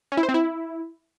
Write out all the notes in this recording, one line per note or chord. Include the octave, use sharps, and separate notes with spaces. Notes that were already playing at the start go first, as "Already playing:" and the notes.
C#4
E4
C5
C4
E4